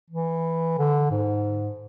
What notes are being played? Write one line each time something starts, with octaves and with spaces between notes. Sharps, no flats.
E3
D3
G#2